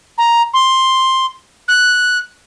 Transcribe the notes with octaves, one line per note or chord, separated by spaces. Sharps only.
A#5
C6
F#6